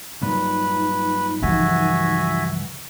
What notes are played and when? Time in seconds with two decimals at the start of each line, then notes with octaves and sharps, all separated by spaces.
0.22 G2 A#2 F#3 D#4 B4
1.42 C#2 G2 E3 F3 F#4 E5 G#5